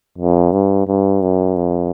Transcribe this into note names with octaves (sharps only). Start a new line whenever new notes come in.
F2
G2
G2
F#2
F2